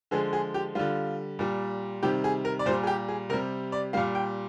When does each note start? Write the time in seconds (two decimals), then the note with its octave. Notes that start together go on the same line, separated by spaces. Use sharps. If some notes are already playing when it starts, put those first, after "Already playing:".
0.11 D3 F3 G#3 G#4
0.33 G#4
0.54 G4
0.75 D3 G3 F4
1.39 A#2 G3
2.03 C3 D#3 G3 G4
2.24 G#4
2.45 A#4
2.59 D5
2.66 A#2 C5
2.69 G3
2.83 G#4
2.87 G4
3.08 G#4
3.29 C3 A#4
3.33 G3
3.72 D5
3.93 A#2 G3 F5
4.15 G5